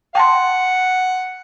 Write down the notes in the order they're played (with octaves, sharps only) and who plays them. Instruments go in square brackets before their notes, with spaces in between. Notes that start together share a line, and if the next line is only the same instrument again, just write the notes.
[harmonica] F#5 [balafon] G5 A5 C6